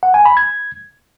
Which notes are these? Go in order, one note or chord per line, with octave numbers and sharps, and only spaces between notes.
F#5
G#5
B5
G#6